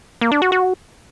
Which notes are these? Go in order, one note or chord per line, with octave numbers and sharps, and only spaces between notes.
A#3
D4
F#4
F#4